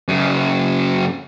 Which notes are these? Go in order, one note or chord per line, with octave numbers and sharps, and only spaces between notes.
F#2 C#3